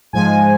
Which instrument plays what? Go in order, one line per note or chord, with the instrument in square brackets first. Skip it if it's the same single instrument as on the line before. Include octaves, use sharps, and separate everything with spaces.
[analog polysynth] G#2 F3 G#3 G#5